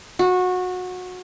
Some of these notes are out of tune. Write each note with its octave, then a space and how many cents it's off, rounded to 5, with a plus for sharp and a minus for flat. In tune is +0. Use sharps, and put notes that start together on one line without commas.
F#4 -20